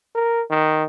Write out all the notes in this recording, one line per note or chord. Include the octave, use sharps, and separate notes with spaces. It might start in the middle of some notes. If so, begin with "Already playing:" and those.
A#4
D#3